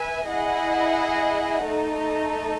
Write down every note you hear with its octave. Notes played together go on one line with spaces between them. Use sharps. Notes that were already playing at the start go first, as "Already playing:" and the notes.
Already playing: B4 E5 G#5
E4 G#4 D#5 F#5
A3 D#4 A4